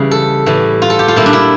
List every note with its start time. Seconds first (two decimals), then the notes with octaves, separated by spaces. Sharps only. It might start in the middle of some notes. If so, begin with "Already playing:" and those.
Already playing: C#3 E3 G3
0.11 A4
0.46 A2 E3 G3
0.82 F4
0.90 A4
0.99 G4
1.08 F4
1.16 A#2 G3 E4
1.26 D4
1.33 E4